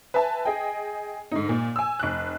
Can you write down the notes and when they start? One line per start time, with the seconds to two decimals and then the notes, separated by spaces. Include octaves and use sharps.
0.14 B4 E5 G#5 A5
0.45 G#4 D#5 G5
1.31 G#2 D3 D#4
1.49 A#2
1.76 G#5 E6
1.99 F1 F#6